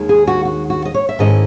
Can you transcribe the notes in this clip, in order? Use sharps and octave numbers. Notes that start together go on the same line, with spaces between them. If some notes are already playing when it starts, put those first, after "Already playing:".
Already playing: D#2 D#3 G#3
G#4
F#4
F#4
F#4
D#5
C#5
E5
G#2 D#3 A3 C#4 E4 D#5